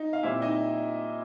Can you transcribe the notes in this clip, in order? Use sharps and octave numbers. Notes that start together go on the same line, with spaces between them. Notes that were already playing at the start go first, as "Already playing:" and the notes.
Already playing: D#4
F5
A#2 G3 C4 E4 E5
D#4 D#5